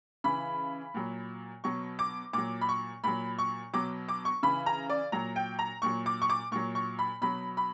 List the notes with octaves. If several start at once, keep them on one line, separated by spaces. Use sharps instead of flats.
C#3 E3 B5
A#2 F#3
B2 F#3 C#6
D6
A#2 F#3 D6
B5
C#6
A#2 F#3 B5
C#6
B2 F#3 D6
D6
C#6
C#3 E3 B5
A#5
D5
A#2 F#3 A#5
G5
A#5
A#2 F#3 C#6
D6
C#6
D6
A#2 F#3 C#6
C#6
B5
B2 F#3 B5
B5